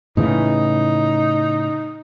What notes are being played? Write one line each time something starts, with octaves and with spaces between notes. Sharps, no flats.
A2 C#3 E3 D#4